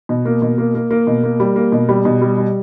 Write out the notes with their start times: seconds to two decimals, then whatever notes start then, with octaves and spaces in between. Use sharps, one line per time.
0.09 B2
0.25 A#3
0.42 B2
0.58 A#3
0.75 A#3
0.91 A#3
1.07 B2
1.24 A#3
1.40 G3
1.56 A#3
1.72 B2
1.89 G3
2.05 B2
2.22 G3
2.38 G3